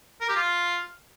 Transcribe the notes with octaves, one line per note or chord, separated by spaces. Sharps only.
A#4
G4
F4